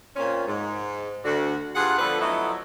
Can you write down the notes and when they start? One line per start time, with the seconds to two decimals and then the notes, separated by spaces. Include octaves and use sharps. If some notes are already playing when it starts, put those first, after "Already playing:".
0.16 A#2 C4 C#4
0.47 G#2
1.24 D2 D3 F#4
1.75 G2 F4 G#4 F#5
1.99 D3 F3 B3 D4 A4 B4
2.21 F3 F#3 A3 B3 D#4 E4